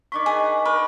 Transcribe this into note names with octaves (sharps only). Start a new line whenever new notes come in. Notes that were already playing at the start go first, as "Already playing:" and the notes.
D#3 D4 B5 C#6 D6
G#4
A#4 B4 C#6